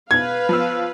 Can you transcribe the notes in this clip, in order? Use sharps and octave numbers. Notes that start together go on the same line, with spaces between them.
B2 B4 F5 G#6
F3 B3 E6